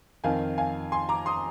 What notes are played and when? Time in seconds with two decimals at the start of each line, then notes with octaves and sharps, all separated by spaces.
0.24 F2 D#3 F5 G#5
0.58 F5 G#5
0.92 G#5 C6
1.09 A#5 D6
1.26 C6 D#6